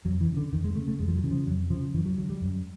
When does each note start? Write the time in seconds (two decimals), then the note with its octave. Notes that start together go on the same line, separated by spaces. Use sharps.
0.05 F2 F#3
0.21 E3
0.29 C#3
0.37 D3
0.52 F2 D#3
0.64 G#3
0.75 C#3 A3
0.88 A3
0.99 F2 G#3
1.08 F3
1.15 F#3
1.24 C#3 E3
1.31 F3
1.46 F2 F#3
1.70 C#3 F3
1.94 F#2 E3
2.06 F#3
2.17 D3 F#3
2.30 G3
2.41 F#2